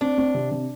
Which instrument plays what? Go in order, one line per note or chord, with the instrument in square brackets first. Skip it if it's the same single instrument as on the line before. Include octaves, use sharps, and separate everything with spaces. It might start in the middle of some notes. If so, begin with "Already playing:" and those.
[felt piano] C4 [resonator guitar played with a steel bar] D4
[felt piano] C4
C3
C3